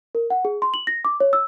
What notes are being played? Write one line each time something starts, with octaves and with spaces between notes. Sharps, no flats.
A#4
F#5
G#4
C6
F#7
A#6
D6
C#5
E6